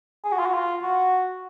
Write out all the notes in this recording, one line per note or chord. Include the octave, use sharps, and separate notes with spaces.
G#4
F#4
F4
F#4
F4
F#4